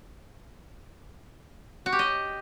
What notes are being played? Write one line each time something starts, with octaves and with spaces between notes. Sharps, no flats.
F#4
G4
D#5